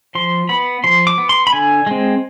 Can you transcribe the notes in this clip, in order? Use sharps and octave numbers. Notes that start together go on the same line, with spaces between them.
F3 C6
B3 B5
F3 C6
D6
B3
C6
B5
D3 G#5
G#3 C4